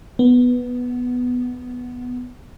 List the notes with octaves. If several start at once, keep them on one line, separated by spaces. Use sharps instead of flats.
B3